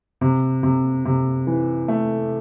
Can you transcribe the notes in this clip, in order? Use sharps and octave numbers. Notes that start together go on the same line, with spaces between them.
C3
C3
C3
E3
A3